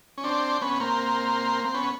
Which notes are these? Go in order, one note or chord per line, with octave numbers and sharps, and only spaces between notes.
C#4
C4 D4
B3 C#4
A#3 C4
C4
B3 C#4